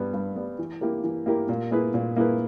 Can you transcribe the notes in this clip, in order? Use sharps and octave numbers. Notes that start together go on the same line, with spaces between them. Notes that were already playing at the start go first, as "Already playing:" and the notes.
Already playing: G2 G3 B3
G2
G3 B3
E3
A#3 E4 G4 A#4
E3
A#3 E4 G4 A#4
A#2
A#3 E4 G#4 B4
A#2
A#3 E4 G#4 B4